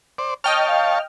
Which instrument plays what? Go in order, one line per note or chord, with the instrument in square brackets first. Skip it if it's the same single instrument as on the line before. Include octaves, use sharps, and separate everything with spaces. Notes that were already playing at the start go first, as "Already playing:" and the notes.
[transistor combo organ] C5 D5
[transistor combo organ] C#5 A5 [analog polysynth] D#5 G5 F6
[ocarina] F5